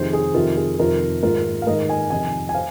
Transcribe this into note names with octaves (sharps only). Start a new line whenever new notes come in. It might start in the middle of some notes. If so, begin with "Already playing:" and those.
Already playing: F2 C3 D#3 G#4 C5
G#4
F2 C3 D#3 F4 A#4
G#4
F2 C3 D#3 F4 A#4
G#2 D#3 F4 A#4
F5
G#2 D#3 A#4 D#5
D#5 G#5
F2 C3 D#3 D#5 G#5
G#5
C5 F5